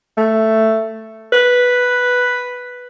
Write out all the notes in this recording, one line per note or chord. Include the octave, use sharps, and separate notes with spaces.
A3
B4